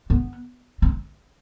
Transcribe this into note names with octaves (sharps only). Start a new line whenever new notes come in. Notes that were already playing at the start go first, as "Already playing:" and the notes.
B3
C4